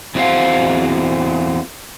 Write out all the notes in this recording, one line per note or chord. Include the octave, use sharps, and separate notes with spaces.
E2 C4 F#4 G#4 C5 F5